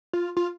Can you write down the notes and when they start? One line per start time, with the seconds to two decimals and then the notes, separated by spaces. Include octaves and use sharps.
0.13 F4
0.37 F4